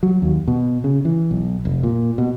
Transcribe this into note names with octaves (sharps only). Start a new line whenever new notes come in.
F#3
D#2
B2
C#3
E3
B1
F1
A#2
B2